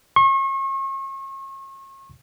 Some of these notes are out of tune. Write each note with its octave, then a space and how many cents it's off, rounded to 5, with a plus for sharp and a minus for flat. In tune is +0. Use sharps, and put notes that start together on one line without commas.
C#6 -40